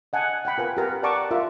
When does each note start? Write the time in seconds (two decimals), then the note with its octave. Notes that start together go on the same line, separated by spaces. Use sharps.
0.13 D#5 F#5 G#5 A5
0.45 F#5 G5 B5
0.58 F4 A#4 B4 G#5
0.77 G4 A#4 F#5
1.03 D5 F#5 A5 A#5 C#6 D6
1.31 F4 A#4 E5